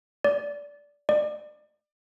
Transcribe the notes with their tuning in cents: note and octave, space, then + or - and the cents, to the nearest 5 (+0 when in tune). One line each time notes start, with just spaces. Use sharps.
D5 -15
D5 +35